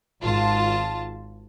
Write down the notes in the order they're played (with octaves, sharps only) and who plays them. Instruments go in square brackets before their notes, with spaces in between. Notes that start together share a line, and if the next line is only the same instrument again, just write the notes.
[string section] G#1 F4 A5